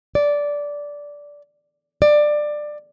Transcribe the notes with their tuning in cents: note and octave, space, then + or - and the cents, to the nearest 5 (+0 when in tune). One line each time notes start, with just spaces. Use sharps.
D5 -10
D5 +15